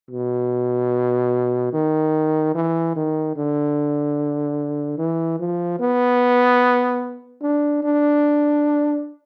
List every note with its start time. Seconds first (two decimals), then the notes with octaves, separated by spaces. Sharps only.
0.11 B2
1.73 D#3
2.55 E3
2.95 D#3
3.36 D3
4.98 E3
5.39 F3
5.79 B3
7.42 D4
7.83 D4